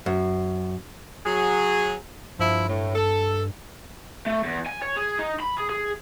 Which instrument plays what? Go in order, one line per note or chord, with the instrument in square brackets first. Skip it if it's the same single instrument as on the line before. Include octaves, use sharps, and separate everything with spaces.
[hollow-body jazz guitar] F#2
[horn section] F#3 G#4
[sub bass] G2 [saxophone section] F3 E4
[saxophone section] A2
A4
[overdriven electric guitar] A3
E2
G#5
C#5
G#4
D#4
B5
G#4
G#4